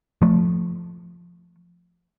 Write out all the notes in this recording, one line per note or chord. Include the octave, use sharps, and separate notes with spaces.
F3 A3